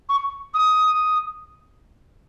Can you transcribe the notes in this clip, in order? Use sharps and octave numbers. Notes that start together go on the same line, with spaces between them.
C#6
D#6